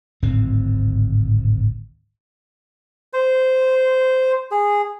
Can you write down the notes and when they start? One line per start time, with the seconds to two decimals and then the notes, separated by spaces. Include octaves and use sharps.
0.22 D1 G#1 A2 C4
3.13 C5
4.51 G#4